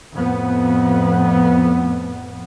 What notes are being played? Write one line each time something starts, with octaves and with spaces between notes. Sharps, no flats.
F2 A2 B3